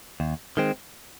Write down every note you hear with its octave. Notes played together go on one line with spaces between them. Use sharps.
D#2
D#3 G#3 C4